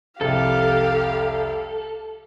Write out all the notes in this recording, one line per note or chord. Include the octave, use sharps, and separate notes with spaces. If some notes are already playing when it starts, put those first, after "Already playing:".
F1 C2 G4 A4 F5